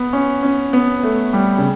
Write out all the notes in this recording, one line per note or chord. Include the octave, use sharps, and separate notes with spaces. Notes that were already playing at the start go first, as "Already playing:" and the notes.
Already playing: B3
C#4
C#4
B3
A3
G3
C#3